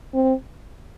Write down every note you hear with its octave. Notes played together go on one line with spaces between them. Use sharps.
C4